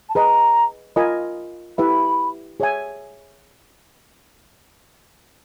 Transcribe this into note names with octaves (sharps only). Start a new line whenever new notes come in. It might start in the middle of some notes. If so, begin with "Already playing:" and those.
A5
G#4 B4 D#5 A#5
F4 A#4 D#5 G#5 B5
E4 G4 B4 E5 B5
G#4 C#5 E5 G#5